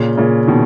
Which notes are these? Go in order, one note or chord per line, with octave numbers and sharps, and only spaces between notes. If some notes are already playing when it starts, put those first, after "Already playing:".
Already playing: A#2 C#3
A#2 C#3
B2 D#3